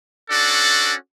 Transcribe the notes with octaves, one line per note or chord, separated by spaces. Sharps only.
C#4 D4 F#4 A4 D5